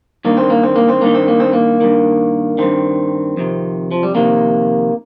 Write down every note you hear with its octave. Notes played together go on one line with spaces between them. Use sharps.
G2 D#3 A#3
C4
A#3
C4
A#3
C4
G2 D#3 A#3
C4
A#3
C4
A#3
G2 D#3
G2 D#3 C4
F2 C3 D#3
F3
G3
F2 C3 D#3 A#3